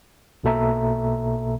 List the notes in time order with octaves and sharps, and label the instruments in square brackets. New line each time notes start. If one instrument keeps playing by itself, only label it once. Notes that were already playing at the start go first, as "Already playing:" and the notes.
[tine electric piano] B1 B2 A#3 A4 E5 A#5